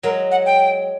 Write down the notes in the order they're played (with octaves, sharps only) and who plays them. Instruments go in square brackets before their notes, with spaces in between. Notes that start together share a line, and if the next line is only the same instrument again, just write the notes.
[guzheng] F#3 G#3 [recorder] A#4
[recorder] F#5
G5